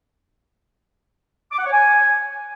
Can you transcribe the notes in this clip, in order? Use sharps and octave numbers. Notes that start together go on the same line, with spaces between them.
D6
F#5
C#5
G#5